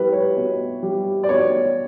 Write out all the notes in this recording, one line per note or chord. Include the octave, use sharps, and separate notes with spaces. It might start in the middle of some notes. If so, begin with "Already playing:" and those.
Already playing: B2 G3 E4 B4
C#5
B2
G3
D5
B2 C#5